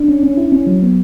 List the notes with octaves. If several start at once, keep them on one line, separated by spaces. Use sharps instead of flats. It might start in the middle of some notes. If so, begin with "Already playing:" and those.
Already playing: D4
C#4
C#4
E4
C#4
F#3
B3